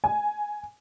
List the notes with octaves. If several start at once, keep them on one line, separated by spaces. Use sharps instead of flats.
G#5